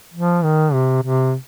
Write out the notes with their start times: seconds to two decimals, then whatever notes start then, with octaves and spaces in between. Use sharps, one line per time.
0.14 F3
0.44 D#3
0.73 C3
1.03 C3